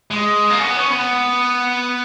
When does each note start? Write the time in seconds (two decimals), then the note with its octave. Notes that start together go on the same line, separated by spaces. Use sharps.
0.11 G#3
0.50 A#3
0.58 C#4
0.63 B3
0.77 C#4
0.90 B3